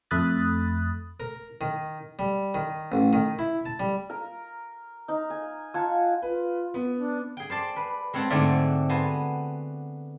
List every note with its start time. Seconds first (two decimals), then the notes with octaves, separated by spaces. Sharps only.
0.11 F2 A3 B5 D#6 F#6 A6
1.20 A#4
1.61 D#3
2.19 G3
2.54 D#3
2.92 A1
3.13 D#3
3.39 E4
3.66 A5
3.80 G3
4.10 A#4 A#5
5.08 D#4
5.30 G#5
5.74 F4 F#5 G#5 A5
6.22 F4 B4
6.74 B3
6.97 D4
7.37 G#4 G5
7.50 C5 D5 A5
7.76 B4
8.13 G#3 C4 C#5 F#5 A5
8.30 G#2 D3 A3 C4 C#5 D5
8.89 B3 F#4 C5 G#5 A5